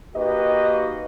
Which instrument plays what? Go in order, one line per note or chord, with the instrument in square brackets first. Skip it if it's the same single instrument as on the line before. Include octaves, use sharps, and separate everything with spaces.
[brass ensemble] A#3 D#4 F#4 G4 B4 D#5